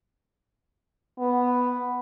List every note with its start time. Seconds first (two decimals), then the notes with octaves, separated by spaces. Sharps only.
1.19 B3